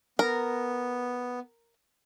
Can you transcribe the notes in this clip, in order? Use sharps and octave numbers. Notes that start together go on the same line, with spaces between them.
B3 A#4